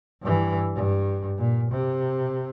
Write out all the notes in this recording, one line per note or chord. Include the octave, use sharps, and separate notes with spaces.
G2 E3
G2
A#2
C3